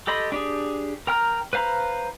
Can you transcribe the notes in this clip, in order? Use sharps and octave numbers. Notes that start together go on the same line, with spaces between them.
G4 A4 D#5 B5 C6
D4 G4 G#4
A#4 G5 A#5 F6
B4 C5 F5 A#5 B5